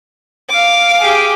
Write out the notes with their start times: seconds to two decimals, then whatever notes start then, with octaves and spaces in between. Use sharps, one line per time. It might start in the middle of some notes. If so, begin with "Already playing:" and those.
0.49 F5 D6
0.99 G4 G#4